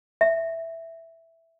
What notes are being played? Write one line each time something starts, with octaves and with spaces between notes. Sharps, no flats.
E5